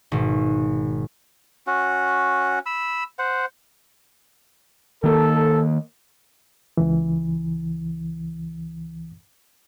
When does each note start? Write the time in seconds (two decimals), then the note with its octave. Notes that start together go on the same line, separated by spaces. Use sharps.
0.12 G#1 B2
1.67 C#4 F#4
2.66 B5 E6
3.19 C5 F#5
5.04 D#3 A#3 A4
6.77 C#2 E3